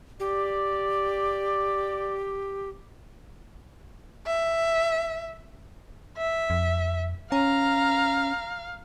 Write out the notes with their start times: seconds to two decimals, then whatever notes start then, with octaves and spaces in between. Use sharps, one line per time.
0.20 G4 D5
4.26 E5
6.17 E5
6.50 F2
7.32 C#4 F5 A#5